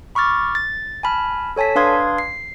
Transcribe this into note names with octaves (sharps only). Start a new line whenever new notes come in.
B5 C#6 D6 F6 A6
A6
G#5 A5 B5 F6
A4 C#5 G#5 A5 B6
D4 B4 F5 C6 D#6 G#6
C7